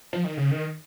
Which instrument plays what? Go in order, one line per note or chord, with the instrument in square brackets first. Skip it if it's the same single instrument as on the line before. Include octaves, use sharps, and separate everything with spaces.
[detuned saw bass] F3
D#3
C#3
D#3